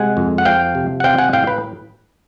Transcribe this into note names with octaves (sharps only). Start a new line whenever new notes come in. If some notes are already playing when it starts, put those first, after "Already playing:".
Already playing: C3 G#3 F#5 G#5
F2
F#5
F3 F5 G5
C3
F#5
C4 F5 G5
F#5 G#5
A2 F5 G5
B4